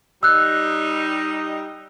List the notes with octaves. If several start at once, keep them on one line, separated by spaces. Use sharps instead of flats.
G3 D#4 E6 F#6